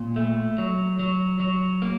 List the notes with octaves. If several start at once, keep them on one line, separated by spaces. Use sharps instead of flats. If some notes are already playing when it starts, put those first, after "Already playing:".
Already playing: A#2
A3
F#3
F#3
F#3
A#3